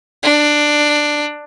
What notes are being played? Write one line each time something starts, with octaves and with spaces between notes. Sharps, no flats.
D4